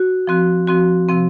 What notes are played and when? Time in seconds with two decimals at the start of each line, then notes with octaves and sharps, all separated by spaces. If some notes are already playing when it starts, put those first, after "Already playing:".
Already playing: F#4
0.27 F3 C4 F#4
0.67 F3 C4 F#4
1.09 C3 F3 C4